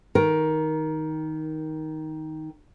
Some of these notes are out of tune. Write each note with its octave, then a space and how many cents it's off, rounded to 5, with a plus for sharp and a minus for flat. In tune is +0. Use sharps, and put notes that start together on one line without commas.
D#3 +10 A#4 +15